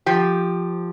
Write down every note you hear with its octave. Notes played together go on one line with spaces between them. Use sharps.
F3 G4